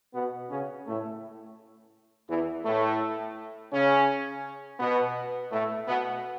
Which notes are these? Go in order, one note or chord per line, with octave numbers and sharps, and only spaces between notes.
B2 B3
C#3 C#4
A2 A3
E2 E3
A2 A3
C#3 C#4
B2 B3
A2 A3
B2 B3